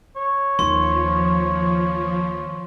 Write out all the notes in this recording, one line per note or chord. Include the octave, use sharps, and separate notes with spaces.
C#5
D#2 F3 C6